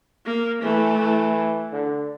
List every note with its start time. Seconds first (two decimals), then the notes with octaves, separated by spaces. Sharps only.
0.26 A#3
0.62 E3 A3
0.99 E3
1.72 D3